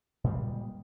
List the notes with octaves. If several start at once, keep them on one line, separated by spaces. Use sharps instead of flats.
A#2 G3 G#3